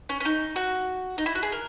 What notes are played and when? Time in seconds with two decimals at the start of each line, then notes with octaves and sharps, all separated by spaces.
0.09 C#4
0.20 C#4
0.25 D#4
0.56 F#4
1.18 D#4
1.26 E4
1.35 F#4
1.43 G#4
1.52 A#4